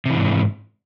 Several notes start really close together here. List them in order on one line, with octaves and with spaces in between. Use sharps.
C3 E3 G#2